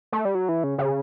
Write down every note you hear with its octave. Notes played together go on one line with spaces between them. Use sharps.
A3
G3
F#3
E3
C#3
C#3